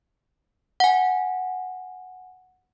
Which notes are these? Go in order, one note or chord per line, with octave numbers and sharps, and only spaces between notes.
F#5 G#5